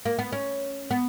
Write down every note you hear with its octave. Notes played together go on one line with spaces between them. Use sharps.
A#3
B3
C#4
B3